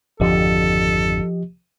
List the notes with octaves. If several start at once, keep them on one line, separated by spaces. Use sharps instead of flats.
G#1 F2 D3 F3 G4 A4 D#5